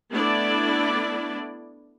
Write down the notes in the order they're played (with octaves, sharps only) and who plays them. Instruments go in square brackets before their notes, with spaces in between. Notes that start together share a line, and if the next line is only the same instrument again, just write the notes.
[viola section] A3 B3 D4 E4 D5